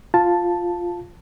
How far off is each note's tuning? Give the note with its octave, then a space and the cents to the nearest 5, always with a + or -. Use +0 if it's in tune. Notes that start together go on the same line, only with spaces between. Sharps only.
F4 +0 A5 +0